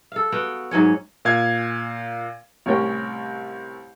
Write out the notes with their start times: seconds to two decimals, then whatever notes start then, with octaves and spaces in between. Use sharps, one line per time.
0.12 A4 F5
0.32 B3 F#4 F5 G5
0.71 G#2 F#3 C#4 C#5
1.25 A#2 F5 G#6
2.66 C2 A2 C#4 A#4 C#5 G5